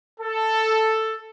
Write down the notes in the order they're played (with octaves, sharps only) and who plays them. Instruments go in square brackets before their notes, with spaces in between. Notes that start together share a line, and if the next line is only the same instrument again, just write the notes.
[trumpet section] A4